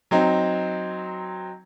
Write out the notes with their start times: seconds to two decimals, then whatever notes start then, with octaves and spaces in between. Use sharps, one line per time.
0.11 F#3 C4 D#4